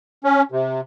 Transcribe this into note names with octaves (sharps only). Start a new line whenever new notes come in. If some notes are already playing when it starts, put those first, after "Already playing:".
C#4
C3